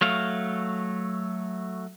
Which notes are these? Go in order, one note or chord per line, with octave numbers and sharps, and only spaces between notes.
F#3 A3 F5